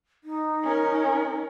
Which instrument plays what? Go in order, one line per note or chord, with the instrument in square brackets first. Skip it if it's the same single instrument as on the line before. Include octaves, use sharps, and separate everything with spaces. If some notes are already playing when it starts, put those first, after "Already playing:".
[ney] D#4
[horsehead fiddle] C#4 A#4